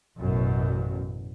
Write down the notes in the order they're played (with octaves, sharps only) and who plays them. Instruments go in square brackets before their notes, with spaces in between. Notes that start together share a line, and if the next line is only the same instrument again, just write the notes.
[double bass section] A1 F#2 B2